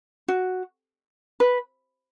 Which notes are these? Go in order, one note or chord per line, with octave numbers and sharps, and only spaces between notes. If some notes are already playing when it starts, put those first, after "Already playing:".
F#4
B4